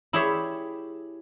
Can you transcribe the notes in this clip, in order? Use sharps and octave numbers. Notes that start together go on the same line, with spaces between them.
E4 G4 G#4 C#5 E5